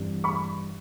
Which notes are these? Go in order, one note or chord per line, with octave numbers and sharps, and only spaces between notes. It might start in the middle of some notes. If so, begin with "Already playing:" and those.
Already playing: G2 E3 G3 C4
B5 C#6